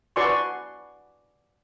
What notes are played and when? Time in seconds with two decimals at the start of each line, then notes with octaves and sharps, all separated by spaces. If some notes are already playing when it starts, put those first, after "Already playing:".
0.16 F#4 B4 D5 G#5 C6 C#6